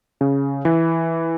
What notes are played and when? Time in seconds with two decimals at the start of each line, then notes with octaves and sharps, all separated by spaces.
0.21 C#3
0.65 E3